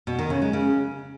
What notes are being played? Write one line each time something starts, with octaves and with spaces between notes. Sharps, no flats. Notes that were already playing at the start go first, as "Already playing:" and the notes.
B2
D#3
C#3
G#3
C#3